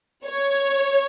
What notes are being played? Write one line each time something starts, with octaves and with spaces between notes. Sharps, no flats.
C#5